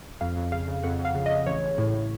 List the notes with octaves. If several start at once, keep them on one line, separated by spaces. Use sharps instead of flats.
F2 F5
F2
C#3 F5
C#3
F2 F#5
F2
F5
C#3
C#3 D#5
A1 C#5
A1
A2
A2